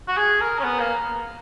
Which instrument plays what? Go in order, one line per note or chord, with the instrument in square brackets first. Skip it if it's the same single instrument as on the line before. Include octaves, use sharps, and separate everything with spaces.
[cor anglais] F#4
G#4
A#4
C#4
B3
A#3